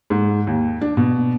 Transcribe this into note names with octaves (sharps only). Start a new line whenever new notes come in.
G#2
D#2
D4
B2